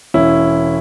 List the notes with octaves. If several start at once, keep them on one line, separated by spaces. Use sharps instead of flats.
E1 C#4 E4